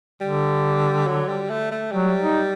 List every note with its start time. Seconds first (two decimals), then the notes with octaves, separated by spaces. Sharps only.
0.21 D3 G3
1.07 F#3
1.29 G3
1.50 A3
1.71 A3
1.92 F#3 G3
2.21 D#4